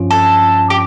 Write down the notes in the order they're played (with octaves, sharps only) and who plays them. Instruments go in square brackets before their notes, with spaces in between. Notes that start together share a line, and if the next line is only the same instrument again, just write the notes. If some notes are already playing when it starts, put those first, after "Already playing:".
Already playing: [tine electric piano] G2 F3 C#4 F4
[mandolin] A4
G4